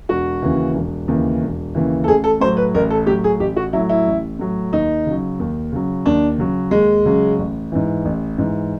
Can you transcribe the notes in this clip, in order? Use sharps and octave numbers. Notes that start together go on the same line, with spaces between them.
E1 F#4
D#2 C#3 E3
E1
D#2 C#3 E3
E1
D#2 C#3 E3
A4
A1 G#4
A4
A2 F#3 C5
B4
A1 A#4
A4
A2 F#3 G4
G#4
A1 G4
F#4
F#3 E4
A2
E4
A1
A2 F#3
D#2 D#4
C#3 F#3
D#2
C#3 F#3
D#2 D4
C#3 F#3
D#2 G#3
C#3 F#3
A1
G#2 E3
A1
G#2 E3